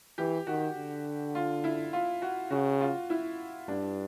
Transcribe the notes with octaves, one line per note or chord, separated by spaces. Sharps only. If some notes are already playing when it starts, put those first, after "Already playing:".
E3 G4
D#3 F#4
D3
F4
E4
F4
F#4
C#3 F#4
F4
E4
G2 D4